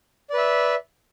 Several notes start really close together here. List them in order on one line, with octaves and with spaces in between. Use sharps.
D5 B4 E5